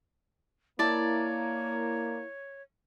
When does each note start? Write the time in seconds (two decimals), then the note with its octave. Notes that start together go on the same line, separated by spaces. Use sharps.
0.79 A#3 E4 C#5 D5 A5